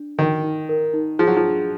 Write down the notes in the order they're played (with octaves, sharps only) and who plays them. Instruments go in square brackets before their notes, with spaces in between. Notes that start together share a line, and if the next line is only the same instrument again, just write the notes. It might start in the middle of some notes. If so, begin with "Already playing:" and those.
Already playing: [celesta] D4
[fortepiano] D#3 [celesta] F#4
[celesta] D#4
A#4
D#4
[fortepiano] F3 [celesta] G#4
[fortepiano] F#3
F3
[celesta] D4